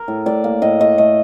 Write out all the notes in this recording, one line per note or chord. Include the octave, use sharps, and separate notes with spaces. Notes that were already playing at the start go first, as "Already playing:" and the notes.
Already playing: A#4
A2
A2 D5
A#3
A2 D#5
A3 D#5
A3 D#5